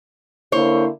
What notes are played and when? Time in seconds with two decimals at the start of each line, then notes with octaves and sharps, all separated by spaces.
0.52 D3 A#3 E4 C5 C#5